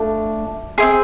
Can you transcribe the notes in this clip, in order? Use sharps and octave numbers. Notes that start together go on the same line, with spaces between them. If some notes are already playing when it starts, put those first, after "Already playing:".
Already playing: A3 D4 F4
C4 E4 G#4 C6